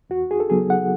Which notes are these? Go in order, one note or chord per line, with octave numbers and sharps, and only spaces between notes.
E2 F#4
G#4
A4
C#3 F#3 B3 G#4
F#5